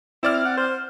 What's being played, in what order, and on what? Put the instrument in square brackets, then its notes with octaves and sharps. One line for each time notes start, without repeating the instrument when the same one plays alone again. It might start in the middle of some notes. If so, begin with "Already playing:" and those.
[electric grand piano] C4 D5 F6 [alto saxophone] E4
[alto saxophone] F#5
C5